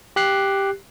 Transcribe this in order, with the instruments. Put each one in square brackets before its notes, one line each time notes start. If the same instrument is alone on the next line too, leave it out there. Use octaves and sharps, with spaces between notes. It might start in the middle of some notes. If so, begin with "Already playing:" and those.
[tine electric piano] G4 F#6 C7